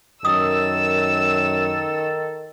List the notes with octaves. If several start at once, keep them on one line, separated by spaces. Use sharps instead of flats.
F#2 D#3 A4 D#6 E6